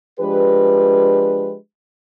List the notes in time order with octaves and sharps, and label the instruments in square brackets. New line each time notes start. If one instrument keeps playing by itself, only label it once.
[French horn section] F3 G#3 D4 G4 B4